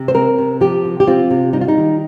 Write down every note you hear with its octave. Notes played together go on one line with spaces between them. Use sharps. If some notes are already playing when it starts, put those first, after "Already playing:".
Already playing: C3
C5
C4 A#4
C3
F3 G4
C3
G4
C4 F4
C3
G3 D#4
F4
D#4
D#3